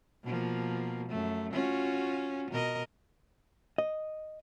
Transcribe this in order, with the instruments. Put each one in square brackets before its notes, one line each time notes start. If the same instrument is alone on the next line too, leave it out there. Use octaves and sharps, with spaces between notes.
[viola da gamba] B2 F3 A#3
F#2 A3
C#4 F4 F#4
B2 A#4 D#5
[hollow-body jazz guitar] D#5